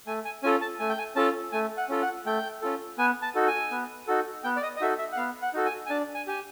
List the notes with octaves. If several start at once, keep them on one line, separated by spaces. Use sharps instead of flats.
A3 G#5
G#5
C#4 F4 A4 G#5
A5
A3 G#5
G5
G#5
C#4 F4 A4 A5
A3 G#5
F#5
C#4 F4 A4
F#5
A3 G5
C#4 F4 A4
B3 G#5
A5
D#4 F#4 A4
G#5
B3
D#4 F#4 A4
B3 G5
D5
D#5
D#5
D#4 F#4 A4 E5
E5
F#5
B3 F5
F#5
D#4 F#4 A4
G#5
G#5
D4 A5
G#5
G4 G#5